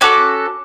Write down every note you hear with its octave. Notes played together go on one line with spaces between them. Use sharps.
C#4 F#4 A4 D6